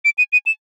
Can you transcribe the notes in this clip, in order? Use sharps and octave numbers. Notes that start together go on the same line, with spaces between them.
D7
D#7
D#7
E7